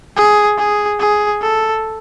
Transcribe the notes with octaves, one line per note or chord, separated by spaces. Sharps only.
G#4
G#4
G#4
A4